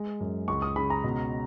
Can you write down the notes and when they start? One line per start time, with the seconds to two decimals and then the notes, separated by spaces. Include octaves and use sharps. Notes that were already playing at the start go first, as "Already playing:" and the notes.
Already playing: G#3
0.20 F#2
0.48 C#2 C#6
0.62 D#6
0.76 C#3 B5
0.90 A#5
1.04 B2